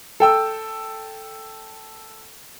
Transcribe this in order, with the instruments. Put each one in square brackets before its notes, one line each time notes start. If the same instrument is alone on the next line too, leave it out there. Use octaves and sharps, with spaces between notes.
[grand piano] A4 G5 E6